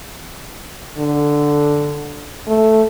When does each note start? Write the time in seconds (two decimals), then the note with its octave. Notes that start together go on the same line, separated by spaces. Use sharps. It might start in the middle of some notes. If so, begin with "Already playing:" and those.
0.97 D3
2.48 A3